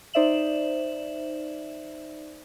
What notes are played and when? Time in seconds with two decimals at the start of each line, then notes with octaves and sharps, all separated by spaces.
0.13 D#4 C5 D5 E5 E7 F#7